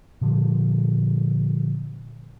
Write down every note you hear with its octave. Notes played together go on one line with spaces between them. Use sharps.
A#2 D3 F3 G3